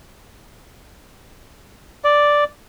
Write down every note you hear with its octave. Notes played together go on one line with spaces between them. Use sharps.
D5